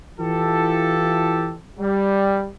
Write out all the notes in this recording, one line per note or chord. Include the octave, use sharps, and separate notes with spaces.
E3 E4 F4 G4 A4
G3